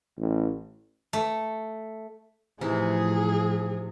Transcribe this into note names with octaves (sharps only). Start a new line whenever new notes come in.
A1
A3
A2 C3 E3 F3 D#4 G#4